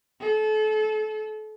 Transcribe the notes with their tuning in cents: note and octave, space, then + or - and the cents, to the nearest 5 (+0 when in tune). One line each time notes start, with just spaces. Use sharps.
A4 -35